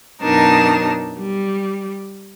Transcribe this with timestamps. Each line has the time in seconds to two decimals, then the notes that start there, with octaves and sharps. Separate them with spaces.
0.22 F#2 B2 D4 D#4 A#4 A5
1.19 G3